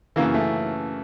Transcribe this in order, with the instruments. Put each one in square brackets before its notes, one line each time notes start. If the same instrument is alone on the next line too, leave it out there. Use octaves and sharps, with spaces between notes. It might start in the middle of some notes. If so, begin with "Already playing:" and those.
[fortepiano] F#2 C#3 E3 A#3
A3